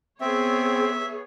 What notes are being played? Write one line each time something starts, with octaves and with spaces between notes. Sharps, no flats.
B3 C4 G#4 C#5 E5